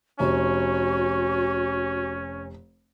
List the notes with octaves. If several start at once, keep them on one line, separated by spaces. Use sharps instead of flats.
F1 C#4 F#4